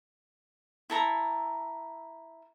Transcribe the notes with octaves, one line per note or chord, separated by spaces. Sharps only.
E4 A4 A#5